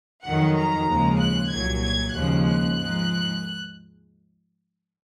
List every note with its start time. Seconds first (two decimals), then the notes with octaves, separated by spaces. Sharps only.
0.25 F2 D#3 F#3 F#5
0.57 A#5
0.88 D#2 C#3 F3 G#3
1.20 F#6
1.51 C2 A#2 F#3 G#6
1.83 G#6
2.13 D#2 C#3 F3 G#3 F#6
2.46 F#6
2.77 G#2 F3 G#3